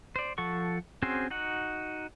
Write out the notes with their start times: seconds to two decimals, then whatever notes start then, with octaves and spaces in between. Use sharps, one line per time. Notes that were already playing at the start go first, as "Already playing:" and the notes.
0.16 C5 D5
0.38 F3 A4 F#5 C#6
1.02 C4 C#4 F#4 G#4 C5
1.30 D#4 F#4 F#5